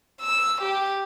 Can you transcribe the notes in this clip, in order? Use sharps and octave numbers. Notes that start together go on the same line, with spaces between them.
E6
G4